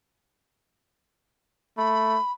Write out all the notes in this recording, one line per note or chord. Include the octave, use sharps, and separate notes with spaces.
A3 B5